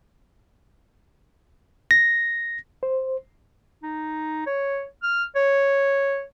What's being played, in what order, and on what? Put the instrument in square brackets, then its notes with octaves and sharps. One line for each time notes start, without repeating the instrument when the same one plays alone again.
[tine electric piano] A#6
[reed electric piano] C5
[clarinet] D#4
C#5
F6
C#5